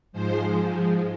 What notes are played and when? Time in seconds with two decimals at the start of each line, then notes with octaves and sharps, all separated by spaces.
0.12 G#2 F3 G#3 C5